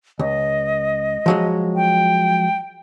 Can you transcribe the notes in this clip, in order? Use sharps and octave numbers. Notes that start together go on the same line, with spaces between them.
C#2 D#5
F3 F#3 G#3
G5